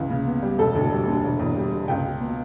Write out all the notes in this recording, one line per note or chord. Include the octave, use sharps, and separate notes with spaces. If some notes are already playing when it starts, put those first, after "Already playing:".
Already playing: C#2 E3
C#3
B3
G3
E1 A4
D2
G3
D3
E1
E2
G3
B2
C#2 G5
B2
B3